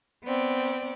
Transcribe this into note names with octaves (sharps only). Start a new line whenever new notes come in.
B3 C4 D5